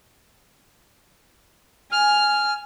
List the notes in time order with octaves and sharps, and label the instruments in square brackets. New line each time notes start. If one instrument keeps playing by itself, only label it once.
[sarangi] G#5 [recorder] F6